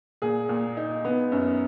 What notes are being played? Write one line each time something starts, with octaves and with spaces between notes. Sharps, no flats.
A#2 G#4
A#2
D#4
B3
F#2